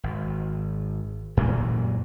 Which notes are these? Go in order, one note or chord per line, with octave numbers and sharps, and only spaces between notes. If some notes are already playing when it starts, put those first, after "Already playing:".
G#1
F#2 A#2 E3 F#3